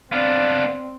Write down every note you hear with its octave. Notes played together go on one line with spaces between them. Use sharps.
B3 C4 D4 D5 F5